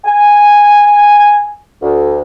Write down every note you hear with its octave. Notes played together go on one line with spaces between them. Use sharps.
G#5
D2